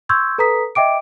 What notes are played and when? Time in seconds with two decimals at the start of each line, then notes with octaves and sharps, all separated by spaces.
0.09 C6 C#6 E6 G6 G#6
0.38 A4 B4 A#5 D#6 B6
0.75 D#5 E5 G5 D6 D7